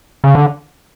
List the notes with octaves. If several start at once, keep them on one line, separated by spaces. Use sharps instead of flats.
C#3
D3